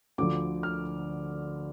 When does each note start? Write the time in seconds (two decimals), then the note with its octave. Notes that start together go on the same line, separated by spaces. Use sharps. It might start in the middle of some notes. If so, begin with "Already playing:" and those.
0.18 D2 D3 F3 D6
0.63 F6